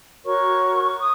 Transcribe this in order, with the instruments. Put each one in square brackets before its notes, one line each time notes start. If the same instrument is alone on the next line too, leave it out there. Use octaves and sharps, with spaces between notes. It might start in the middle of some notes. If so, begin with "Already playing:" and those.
[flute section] F#4 A#4 C#5 C#6
D#6